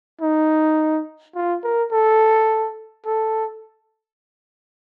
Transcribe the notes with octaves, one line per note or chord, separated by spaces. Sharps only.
D#4
F4
A#4
A4
A4